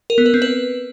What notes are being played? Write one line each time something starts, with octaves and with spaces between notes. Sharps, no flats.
A#4
B3
B4
C4
B4